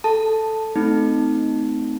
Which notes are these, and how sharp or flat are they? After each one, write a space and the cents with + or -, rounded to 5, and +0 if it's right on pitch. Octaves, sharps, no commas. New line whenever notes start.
A4 +0 A5 +0
A3 +0 C4 -25 D#4 +0